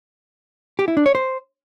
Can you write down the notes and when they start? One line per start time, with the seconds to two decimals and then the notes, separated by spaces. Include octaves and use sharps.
0.79 G4
0.88 E4
0.97 D4
1.06 C#5
1.15 C5